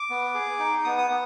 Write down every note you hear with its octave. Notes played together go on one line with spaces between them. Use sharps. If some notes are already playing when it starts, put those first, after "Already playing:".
Already playing: D6
B3
G#4
D#4
B3 D#6
D#6
B3